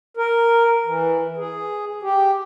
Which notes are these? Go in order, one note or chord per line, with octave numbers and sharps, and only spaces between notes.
A#4
E3
G#4
G4